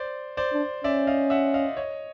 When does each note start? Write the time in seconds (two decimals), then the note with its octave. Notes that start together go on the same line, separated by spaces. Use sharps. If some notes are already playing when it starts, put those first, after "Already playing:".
Already playing: C5 D5
0.37 C5 D5
0.53 D4
0.84 C#4 D5 E5
1.07 D#5 F5
1.30 E5 F#5
1.54 D#5 F5
1.77 C#5 D#5